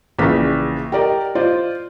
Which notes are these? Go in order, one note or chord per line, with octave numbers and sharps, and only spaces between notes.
A#1 C#3 E3 B6
G4 A#4 D5 D#5
F4 C5 D5 D#5